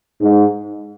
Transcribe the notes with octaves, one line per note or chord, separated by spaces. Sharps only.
G#2